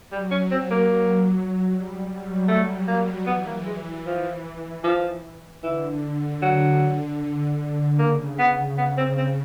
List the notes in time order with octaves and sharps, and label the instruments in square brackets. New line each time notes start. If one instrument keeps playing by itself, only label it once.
[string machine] F#3 [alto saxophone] G3
[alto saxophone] C#4
C4
A#3
[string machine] G3
F#3
[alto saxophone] A3
A#3
[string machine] E3 [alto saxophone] B3
[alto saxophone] A#3
G#3
F3
F3
[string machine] D3 [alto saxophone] E3
[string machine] D3 [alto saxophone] F#3
[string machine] C#3 [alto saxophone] A#3
[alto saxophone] B3
B3
C4
C4